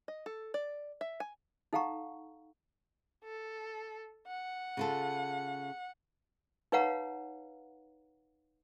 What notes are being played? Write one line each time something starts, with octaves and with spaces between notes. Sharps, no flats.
D#5
A4
D5
E5
G#5
D#4 A4 F5 F#5 A#5 C#6
A4
F#5
C#3 F4 A4
D#4 B4 C#5 F5 F#5 A#5